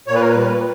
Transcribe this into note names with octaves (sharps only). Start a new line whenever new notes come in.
A#2 C#5
B4
A#4
B4
G3